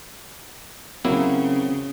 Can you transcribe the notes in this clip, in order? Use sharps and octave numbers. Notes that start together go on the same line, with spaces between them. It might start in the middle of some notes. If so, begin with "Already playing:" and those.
C#3 F#3 A#3 C4 E4